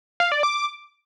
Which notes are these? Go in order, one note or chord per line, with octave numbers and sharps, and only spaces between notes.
F5
D5
D6